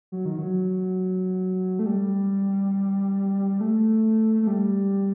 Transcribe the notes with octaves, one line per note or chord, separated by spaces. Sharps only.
F#3
D#3
F#3
A3
G3
A3
A3
G3